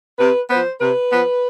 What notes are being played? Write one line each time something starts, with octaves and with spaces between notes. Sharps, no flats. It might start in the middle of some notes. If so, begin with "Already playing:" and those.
C3 B4
F3 B3 C5
C3 B4
F3 B3